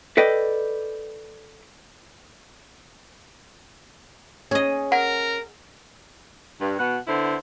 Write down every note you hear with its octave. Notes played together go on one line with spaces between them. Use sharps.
A4 B4 D5 D#5 G5
C#4 G#4 D#5
A#4 F#5
G2
B2 F#5
D3 B3 E4 C5